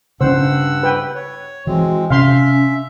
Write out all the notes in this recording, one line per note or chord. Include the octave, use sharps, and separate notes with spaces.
G2 C#3 C4 C#4 C5 F#5 E6
B4 G5
C#5
E3 G#3 C4 F#4
C3 C#4 E5 F5 C6